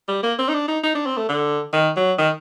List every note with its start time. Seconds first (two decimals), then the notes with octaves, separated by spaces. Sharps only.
0.08 G3
0.23 A#3
0.39 C4
0.49 D#4
0.54 D4
0.68 D#4
0.83 D#4
0.95 D4
1.06 C4
1.17 A3
1.29 D3
1.73 D#3
1.97 F#3
2.18 D#3